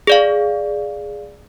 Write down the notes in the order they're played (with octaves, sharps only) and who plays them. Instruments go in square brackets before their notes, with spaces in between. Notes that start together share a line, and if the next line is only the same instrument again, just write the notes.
[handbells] G#4 D5 F5